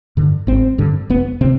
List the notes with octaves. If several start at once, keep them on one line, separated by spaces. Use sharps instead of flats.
G2 D3
G#1 C4
G2 D3
F1 B3
C3 C4